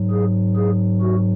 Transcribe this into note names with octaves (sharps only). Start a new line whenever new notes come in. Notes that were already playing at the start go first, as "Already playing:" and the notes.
Already playing: G#2 F#3
G#4
G#4
F#4